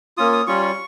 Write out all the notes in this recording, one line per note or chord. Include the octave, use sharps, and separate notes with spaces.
A#3 C#4 F4 D#6
D#6
G3 C#4 F4 C#6
C#6